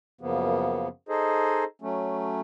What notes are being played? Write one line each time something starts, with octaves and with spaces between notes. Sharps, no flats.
F#2 C#3 F3 A#3 B3
D#4 G#4 A4 C5 D#5
F#3 A3 C#4